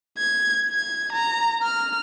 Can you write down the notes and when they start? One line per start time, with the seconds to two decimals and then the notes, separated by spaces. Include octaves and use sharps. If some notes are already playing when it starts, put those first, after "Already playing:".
0.18 G#6
0.70 G#6
1.13 A#5
1.63 F6